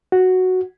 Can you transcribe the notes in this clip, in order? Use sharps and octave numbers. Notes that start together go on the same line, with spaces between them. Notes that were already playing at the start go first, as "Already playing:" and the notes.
F#4